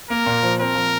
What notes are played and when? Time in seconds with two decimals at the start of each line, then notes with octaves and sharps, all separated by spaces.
0.10 A#3 A#4
0.26 A#2
0.43 F3
0.60 C4 A#4
0.75 F3